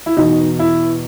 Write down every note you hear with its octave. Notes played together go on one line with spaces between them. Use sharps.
E4
E2 B2 D#4
E4